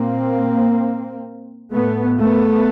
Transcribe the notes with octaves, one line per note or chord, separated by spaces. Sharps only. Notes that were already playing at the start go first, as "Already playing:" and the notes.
Already playing: A#2 A#3 C4
A2 A3 B3
A3 B3